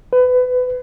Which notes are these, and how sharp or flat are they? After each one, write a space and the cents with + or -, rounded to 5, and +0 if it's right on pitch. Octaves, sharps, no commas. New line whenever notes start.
B4 +25